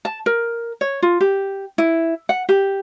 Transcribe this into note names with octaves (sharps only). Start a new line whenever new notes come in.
A5
A#4
C#5
F4
G4
E4
F#5
G4